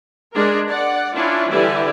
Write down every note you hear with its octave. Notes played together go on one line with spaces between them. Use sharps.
G#3 D4 G#4 A#4
D5 F#5
C#4 D4 E4 F4
D3 E3 G3 E4 G4 D5